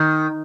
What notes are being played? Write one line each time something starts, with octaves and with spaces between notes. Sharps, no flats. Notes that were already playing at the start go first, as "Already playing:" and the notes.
Already playing: D#3